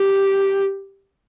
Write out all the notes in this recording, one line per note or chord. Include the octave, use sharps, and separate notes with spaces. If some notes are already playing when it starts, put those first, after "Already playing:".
Already playing: G4